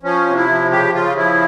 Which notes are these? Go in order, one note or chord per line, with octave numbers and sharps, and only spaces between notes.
F3 C#4
C3
E4
F3
C#3 G4
C#3 F4
F3 E4